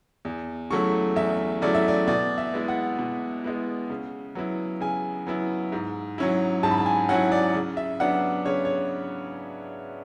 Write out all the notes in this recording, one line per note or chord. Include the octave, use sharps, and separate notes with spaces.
E2
C#3 F#3 A3 E4 C#6
E2 E5
C#3 F#3 A3 E4 D5
E5
D5
B2 D5
E5
G#3 B3 E4
F#5
B2
G#3 B3 E4
C#3
F#3 B3 E4
C#3 G#5
F#3 B3 E4
G#2
F#3 C#4 E4
G#2 A5
B5
A5
G#5
F#3 C#4 E4 F#5
D5
C#3
E5
F#3 B3 D4 F#5
C#3 C#5
C#5